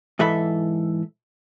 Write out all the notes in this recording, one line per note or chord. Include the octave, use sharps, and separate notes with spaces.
G#2 E3 A4 E5 B5